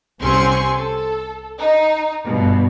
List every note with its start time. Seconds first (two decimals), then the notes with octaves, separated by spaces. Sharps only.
0.20 C2 C4 C#4 G#5 C6 C#6
0.76 A4
1.58 D#4
2.25 G2 B2